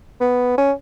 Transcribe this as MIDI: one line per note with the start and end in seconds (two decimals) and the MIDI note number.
0.21 0.57 59
0.58 0.73 61